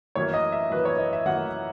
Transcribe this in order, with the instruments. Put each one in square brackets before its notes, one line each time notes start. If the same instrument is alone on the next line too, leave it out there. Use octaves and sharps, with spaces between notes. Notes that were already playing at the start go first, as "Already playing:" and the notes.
[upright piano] F#2 E3 A#3 C#5
D#5
E5
F#2 E3 A#3 B4
C#5
D#5
E5
F#2 E3 A#3 F#5